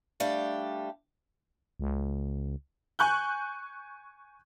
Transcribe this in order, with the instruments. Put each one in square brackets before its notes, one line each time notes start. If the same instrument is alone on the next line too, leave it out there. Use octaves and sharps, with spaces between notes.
[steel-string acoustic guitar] G3 A3 D4 G4 F5
[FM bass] C#2
[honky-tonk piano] G#5 C#6 F#6 G6